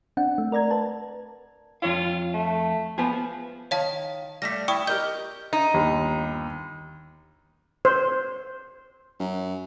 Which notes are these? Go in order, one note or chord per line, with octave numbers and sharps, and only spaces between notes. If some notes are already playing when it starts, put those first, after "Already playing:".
C4 D4 F#5
A3
A#4 D5 A#5 G#6
B4 A5
F2 F4 C#5 F5
A3
F3 B3 G#4
D#3 C#5 F5 A5
G3 A3 A#6 B6
E4 D5 G5 C#6 D#6
G4 A#4 D#5 G6 G7
D#4
G1 D#2 B5
C5
F#2